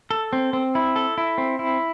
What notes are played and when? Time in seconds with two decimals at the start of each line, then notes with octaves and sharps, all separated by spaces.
0.11 A4
0.33 C4
0.53 C4
0.75 E4
0.96 A4
1.18 E4
1.38 C4
1.59 E4